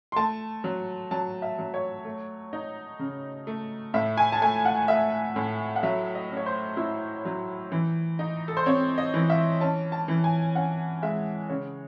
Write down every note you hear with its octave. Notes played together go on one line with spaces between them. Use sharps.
C6
A3 A5
F#3
F#3 A5
E5
F#3
C#5
A3
D#4
C#3
A3
A2 E5
G#5
A5
A3 G#5
F#5
A3 E5
A2
F#5
F#3 E5
D#5
C#4
C#5
C5
E4
F#3
E3
D#4
A4
C5
C4 C#5
D#5
E3
E5
C#4 A5
A5
E3
G#5
C#4 F#5
G#3 E5
C#3 C#5